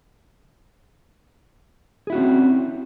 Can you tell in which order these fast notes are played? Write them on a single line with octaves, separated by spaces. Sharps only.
G#4 E4 F#4 C#4 C4